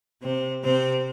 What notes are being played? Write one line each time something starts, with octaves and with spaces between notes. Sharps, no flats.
C3 C4
C3 C4